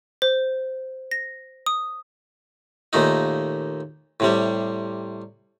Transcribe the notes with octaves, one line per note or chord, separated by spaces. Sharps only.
C5
A#6
D#6
D#2 A#2 A3 D#4
A2 C3 G3